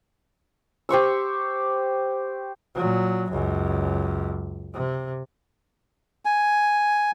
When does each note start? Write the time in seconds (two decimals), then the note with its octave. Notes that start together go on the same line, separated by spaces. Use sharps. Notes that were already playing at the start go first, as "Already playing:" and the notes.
0.89 G4 C5 C#6 E6
2.75 A#2 F#3
3.30 C#2 F#2
4.74 C3
6.25 G#5